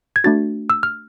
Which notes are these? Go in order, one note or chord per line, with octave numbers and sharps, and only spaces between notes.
G#6
A3 D4 F#4 A6
E6
F6